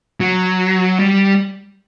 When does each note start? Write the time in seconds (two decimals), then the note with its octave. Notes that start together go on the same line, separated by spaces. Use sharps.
0.20 F#3
0.99 G3